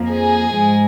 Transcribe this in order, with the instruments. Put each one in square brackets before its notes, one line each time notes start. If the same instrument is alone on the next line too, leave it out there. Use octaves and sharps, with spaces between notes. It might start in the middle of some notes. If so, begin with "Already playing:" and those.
Already playing: [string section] F2 F3 A#3
G#4
G#2 G#3